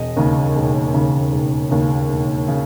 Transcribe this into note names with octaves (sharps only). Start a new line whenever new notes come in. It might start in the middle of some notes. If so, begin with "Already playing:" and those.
Already playing: E1 D#5
D#2 C#3
E1
D#2 C#3
E1
D#2 C#3
E1
C#3